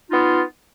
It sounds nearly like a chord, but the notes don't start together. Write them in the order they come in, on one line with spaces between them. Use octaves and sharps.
D#4 F4 B3